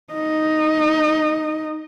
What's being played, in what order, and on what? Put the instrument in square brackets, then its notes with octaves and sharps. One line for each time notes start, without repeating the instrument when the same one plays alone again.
[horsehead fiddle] D#4 D#5